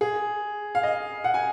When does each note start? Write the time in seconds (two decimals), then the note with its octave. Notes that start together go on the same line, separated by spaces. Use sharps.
0.01 G#4
0.75 F5
0.83 D#5
1.24 F#5
1.34 G#5